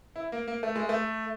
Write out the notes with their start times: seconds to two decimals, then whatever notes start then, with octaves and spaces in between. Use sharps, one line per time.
0.16 E4
0.32 A#3
0.48 A#3
0.63 A3
0.76 G#3
0.89 A3